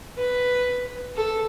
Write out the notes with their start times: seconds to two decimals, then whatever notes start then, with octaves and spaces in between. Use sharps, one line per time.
0.17 B4
1.16 A4